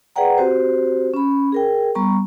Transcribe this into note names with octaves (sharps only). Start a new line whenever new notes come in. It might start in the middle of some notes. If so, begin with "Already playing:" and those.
G#4 B4 D5 F#5 G5 A#5
C4 F#4 G4 C5
C#4 B5
G#4 A#4 G5
G3 B3 A#5 C#6